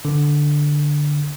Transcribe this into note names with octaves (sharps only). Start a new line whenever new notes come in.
D3